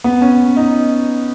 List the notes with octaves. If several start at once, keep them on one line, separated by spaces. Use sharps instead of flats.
B3
C#4
D#4